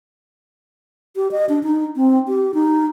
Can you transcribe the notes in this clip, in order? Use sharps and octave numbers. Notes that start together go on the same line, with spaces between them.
G4
D#5
D4
D#4
C4
G4
D#4